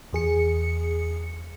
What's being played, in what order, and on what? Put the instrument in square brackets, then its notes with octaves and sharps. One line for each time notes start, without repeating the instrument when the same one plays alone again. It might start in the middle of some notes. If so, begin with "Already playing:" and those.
[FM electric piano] E2 G#4 C#7